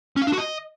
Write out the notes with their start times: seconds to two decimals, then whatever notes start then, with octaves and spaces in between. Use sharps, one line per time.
0.16 C#4
0.22 F5
0.27 D4
0.32 F#4
0.38 D#5